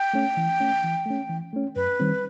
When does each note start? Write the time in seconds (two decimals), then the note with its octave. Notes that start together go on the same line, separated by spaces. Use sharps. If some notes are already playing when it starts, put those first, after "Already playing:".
Already playing: G5
0.13 A3 C#4
0.37 E3
0.60 A3 C#4
0.84 E3
1.06 A3 C#4
1.29 E3
1.53 A3 C#4
1.76 F#2 B4
2.00 D#3 G3 C4